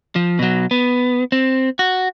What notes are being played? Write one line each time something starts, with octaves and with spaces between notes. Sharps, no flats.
F3
B2 F#3
B3
C4
F#4